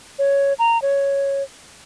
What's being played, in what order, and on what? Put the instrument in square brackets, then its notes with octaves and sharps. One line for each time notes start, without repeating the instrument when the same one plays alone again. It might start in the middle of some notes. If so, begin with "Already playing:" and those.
[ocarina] C#5
A#5
C#5